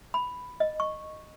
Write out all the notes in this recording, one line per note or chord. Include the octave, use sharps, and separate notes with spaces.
B5
D#5
C#6